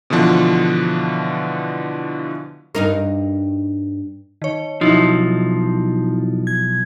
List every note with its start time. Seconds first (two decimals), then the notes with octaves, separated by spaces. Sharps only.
0.10 B2 D3 E3 F3 D4 F4
2.75 G2 D#4 A#4
4.42 D#3 C#5
4.81 B1 F3 D#4 E4 F#4
6.47 G#6